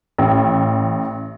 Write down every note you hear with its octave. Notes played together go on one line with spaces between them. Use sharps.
A1